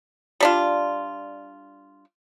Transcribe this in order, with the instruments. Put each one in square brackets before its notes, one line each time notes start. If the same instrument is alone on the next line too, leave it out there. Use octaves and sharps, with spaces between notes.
[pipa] G3 D4 F4